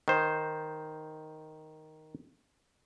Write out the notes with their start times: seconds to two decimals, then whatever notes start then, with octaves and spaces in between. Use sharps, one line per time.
0.08 D#3 C5